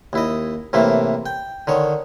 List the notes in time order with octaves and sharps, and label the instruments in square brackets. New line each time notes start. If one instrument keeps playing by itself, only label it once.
[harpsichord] D#2 E4 D#5
A2 C3 E3 A#3 E4
G5
D3 D#3 C#5